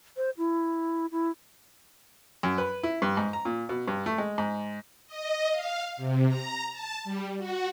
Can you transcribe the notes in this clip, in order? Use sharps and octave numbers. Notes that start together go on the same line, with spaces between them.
C5
E4
E4
F#2
B4
E4
G2
G#2
A#5
A#2
B2
G2
A3
G#3
G#2
D#5
F5
C3
A#5
A5
G3
F#4